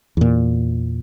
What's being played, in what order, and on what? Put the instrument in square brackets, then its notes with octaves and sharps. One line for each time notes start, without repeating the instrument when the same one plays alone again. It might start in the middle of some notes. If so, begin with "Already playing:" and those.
[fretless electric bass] E2 A#2